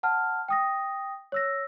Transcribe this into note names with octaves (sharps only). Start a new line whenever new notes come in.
F#5 A5 F6
G5 D#6 A#6
C#5 E6 A#6